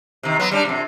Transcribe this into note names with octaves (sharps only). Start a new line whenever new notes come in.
C3 D#3
F#3 B3
G3 C#4 D4
F2 C3